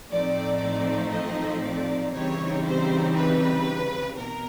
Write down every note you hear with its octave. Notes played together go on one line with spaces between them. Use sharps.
A2 F3 A3 C4 D#4 D5
D#5
D5
C#3 E3 G3 C4 D#4 C#5
C5
B4
B2 A#4